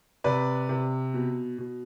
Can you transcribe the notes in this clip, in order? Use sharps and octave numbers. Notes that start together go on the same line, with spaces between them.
C3 B4 D5
C3
B2
B2